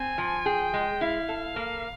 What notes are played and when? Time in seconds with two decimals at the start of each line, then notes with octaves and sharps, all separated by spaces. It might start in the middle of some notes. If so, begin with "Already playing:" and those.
Already playing: C4 G#5
0.18 F3
0.46 G#4 G5
0.74 G#3
1.01 E4 F5
1.29 A4
1.56 A#3